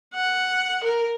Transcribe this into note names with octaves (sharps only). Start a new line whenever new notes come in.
F#5
A#4